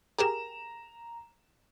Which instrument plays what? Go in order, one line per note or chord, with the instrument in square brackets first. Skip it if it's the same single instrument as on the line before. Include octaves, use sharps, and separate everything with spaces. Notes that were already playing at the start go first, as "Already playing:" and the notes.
[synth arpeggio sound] G4 G#4 A#4 [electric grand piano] A#5 E7